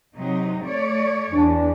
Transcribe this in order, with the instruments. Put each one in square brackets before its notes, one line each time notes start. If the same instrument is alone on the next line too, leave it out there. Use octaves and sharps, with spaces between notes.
[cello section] C3 F#3 D#4
A3 C#5 D5
[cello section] E2 [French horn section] D4